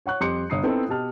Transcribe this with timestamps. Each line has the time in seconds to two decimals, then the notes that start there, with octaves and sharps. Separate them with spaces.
0.06 C#5 F#5 C#6 F#6
0.20 F2 G3 C6 D6 G6 C#7
0.50 G1 D#6 C7
0.64 B3 C4 D#4 E4 A4 G5
0.89 B2 G4 A5 F6